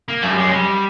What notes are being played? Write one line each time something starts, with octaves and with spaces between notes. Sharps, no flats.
A#3
F#2 A3
G3
G#3
F#3
G3